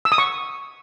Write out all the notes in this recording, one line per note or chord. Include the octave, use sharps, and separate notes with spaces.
E6
D#6
C#6